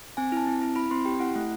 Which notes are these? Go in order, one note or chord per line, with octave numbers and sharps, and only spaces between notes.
C4 G#5
E4 A5
C4
E4
E4 B5
C4 C6
G4 G5
E4 F#5
A3